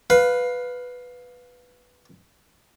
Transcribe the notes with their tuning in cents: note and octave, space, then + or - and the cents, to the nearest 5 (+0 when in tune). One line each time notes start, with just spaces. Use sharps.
B4 +0 F5 +15